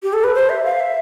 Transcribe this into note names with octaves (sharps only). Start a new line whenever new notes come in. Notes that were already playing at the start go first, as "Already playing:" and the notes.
G4
A4
B4
C5
E5
F5
E5